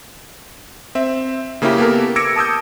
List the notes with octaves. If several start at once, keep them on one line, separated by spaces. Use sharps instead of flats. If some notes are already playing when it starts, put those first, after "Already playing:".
C4 E5
C#3 A#3 C#4 E4 G4
A#3 B3 G4 A4 A#4
D6 E6 G#6 A#6 C#7 D7
A5 D#6 E6 G6